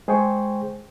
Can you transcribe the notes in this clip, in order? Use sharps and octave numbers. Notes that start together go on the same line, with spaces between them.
G#3 G#4 C5 G5 G#5 C#6